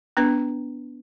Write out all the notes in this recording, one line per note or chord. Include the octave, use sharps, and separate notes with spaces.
B3 D4 B4